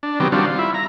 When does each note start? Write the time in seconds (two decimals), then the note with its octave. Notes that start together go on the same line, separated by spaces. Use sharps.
0.03 D4
0.20 D#3 F#3 B3 C4 G4
0.32 D#3 G3 C4 D4 F4 F#4
0.46 F4
0.59 E4
0.74 A#5